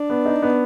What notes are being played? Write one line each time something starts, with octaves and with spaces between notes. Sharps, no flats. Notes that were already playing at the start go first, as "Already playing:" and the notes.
Already playing: D4
B3
D#4
B3